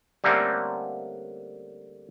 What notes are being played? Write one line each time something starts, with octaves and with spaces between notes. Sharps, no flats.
D3 G3 A3 A#3 C4 C#4